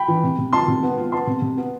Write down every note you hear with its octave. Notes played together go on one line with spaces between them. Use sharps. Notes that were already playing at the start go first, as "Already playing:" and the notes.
Already playing: G5 B5
E3
C3
C3
F4 A5 C6
C3
B3
F4
B3 A5 C6
C3
C3
B3